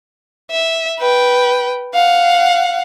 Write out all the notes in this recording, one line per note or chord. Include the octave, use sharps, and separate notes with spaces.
E5
B4 G5
F5 F#5